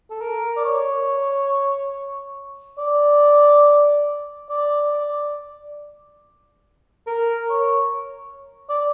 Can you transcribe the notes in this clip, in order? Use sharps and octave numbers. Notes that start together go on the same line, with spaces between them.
A4
A#4
D5
C#5
D5
D5
D5
A#4
C#5
D5